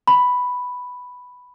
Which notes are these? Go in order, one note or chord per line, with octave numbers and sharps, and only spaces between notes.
B5